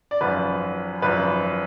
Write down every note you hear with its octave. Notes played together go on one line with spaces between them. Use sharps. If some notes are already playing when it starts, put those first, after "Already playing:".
D5
G#1 F#2 F3 B4
G#1 F#2 F3 B4